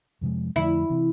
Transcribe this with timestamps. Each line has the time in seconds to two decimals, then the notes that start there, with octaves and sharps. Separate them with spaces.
0.21 F2 C3 F3 G#3
0.56 F2 D3 F3 A3 E4
0.90 C3 E3